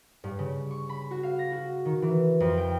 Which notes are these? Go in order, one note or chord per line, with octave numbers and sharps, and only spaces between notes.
G2
C#3
C#6
B5
F#4
F5
A#6
F#4
D#3
E3
F2
G5